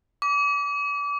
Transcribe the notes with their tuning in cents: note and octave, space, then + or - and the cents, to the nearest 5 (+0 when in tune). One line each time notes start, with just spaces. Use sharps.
D6 -30